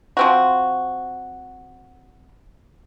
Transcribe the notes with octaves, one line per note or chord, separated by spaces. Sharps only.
F3 C4 F#4